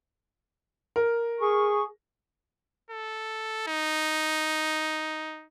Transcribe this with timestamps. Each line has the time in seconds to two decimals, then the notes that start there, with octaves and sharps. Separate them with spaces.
0.96 A#4
1.41 G#4 C#6
2.90 A4
3.67 D#4